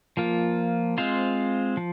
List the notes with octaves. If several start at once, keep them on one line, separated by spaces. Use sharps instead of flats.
F3 A#3 F4
G#3 C4 F4 C5 F5
F3